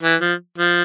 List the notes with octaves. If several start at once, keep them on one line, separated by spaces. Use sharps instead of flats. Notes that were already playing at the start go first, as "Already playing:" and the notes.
E3
F3
F3